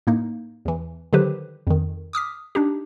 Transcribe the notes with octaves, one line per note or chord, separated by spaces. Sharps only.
A2 A#3 D#4
E2 E3
D3 D#3 F#3 G4 B4 C5
F2 D#3
D6 D#6 F6 B6
D4 D#4 G4